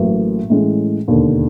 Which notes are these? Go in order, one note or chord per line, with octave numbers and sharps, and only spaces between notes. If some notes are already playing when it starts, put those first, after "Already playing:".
Already playing: A1 A2 F#3 A#3
A2 E3 G#3 C#4
E1 D#2 D3